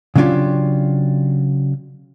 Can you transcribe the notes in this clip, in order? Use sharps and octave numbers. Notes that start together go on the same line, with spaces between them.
C#3 F#3 C#4 D4 F4 G4